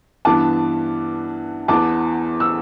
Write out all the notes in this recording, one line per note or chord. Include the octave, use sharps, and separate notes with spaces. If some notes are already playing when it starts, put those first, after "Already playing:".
G2 E3 B3 A5 D6
E2 E3 B3 A5 D6
E6